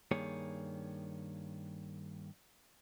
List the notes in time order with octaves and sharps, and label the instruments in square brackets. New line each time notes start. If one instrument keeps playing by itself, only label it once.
[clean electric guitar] G2 D#3 A#3 G#4 C#5